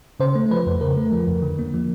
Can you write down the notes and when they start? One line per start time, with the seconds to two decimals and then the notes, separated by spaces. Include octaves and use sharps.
0.20 C#3 C5
0.35 A3
0.51 F3 B4
0.66 F2
0.81 C#3 A#4
0.97 A3
1.12 F3
1.27 F2
1.42 D3
1.59 A#3
1.74 F3